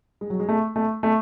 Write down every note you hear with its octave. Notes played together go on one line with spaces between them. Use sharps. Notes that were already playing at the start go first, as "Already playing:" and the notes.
G#3
F#3
G#3
A3
A3
A3